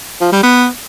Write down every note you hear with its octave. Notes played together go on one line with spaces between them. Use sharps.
F3
G3
B3